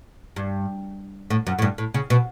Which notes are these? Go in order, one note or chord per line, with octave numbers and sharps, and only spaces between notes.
G2
A2
F#2
A2
G2
A2
C#3
B2